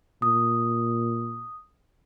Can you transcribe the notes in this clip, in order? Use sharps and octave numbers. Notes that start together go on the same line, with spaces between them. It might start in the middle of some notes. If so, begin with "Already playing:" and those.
A#2 D#6